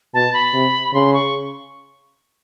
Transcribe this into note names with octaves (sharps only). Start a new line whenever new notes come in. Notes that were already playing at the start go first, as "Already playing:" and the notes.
B2 A5
B5
C3
C#3 C6
C#6